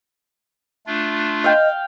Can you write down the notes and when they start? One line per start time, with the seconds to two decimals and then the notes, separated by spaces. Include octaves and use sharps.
0.87 A3 D4 F4
1.44 D#5 F5 G5